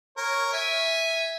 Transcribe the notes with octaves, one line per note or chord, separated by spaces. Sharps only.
A#4 C#5
E5 G#5